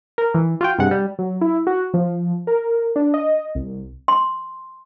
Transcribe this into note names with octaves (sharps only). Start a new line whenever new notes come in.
A#4
E3
F4 F#4 G5
G2 C3 G#3 F#5
G3
F#3
E4
F#4
F3
A#4
D4
D#5
C2
C6